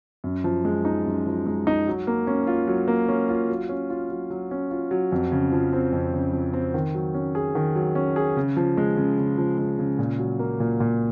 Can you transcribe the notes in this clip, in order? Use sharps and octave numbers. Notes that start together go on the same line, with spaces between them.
F#2
F3
G#3
D#4
F#2
F3
G#3
D#4
F#3
A#3
C#4
F4
F#3
A#3
C#4
F4
F#3
C#4
F4
F#3
F#3
C#4
F4
F#3
F2
C#3
F3
C4
F2
C#3
F3
C4
D#3
F#3
C#4
G#4
D#3
F#3
C#4
G#4
C#3
F3
G#3
C#3
C#3
F3
G#3
C#3
A#2
F#3
A#3
A#2
A#2